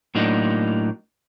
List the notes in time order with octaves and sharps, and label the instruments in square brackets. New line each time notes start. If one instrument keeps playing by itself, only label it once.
[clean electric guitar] A2 F#3 A#3 D4 D#4